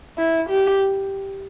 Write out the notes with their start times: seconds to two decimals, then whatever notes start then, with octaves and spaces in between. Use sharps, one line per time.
0.18 E4
0.50 G4